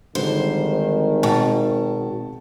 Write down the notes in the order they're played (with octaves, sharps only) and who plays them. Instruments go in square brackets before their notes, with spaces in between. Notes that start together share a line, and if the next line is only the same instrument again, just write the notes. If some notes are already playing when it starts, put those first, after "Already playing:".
[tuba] G#1 [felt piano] D3 F3 G3 [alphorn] D#3 [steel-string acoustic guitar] C5
[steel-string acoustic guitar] B2 [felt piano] G5 A5 C#6